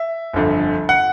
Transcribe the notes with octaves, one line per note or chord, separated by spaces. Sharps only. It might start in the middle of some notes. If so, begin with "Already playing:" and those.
Already playing: E5
G1 F2 D3
F#5